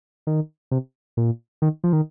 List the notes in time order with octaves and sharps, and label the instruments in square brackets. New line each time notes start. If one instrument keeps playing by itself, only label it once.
[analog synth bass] D#3
C3
A#2
D#3
F3
D#3